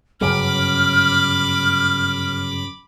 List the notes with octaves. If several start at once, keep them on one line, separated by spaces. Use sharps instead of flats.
G1 F#2 C#3 B5 D6 F6